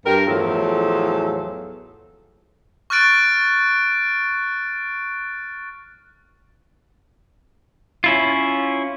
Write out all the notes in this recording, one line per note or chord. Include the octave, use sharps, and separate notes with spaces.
G2 G4 A#4
E2 A2 F3 F#3 A4
C#6 F6 F#6 A6 D7
C#4 E4 F4